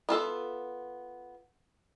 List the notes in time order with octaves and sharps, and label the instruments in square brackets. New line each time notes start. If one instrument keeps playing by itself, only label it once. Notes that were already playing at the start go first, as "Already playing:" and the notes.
[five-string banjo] B3 F4 A4 E5